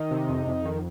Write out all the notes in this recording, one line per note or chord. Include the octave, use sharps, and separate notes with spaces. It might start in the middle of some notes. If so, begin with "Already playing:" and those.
Already playing: D#3 D#4
C3
F2
F2
D#3